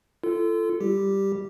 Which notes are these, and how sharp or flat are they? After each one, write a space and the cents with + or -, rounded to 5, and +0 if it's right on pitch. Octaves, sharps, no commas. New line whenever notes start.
F4 -30 A4 +0
G3 +0 G4 +0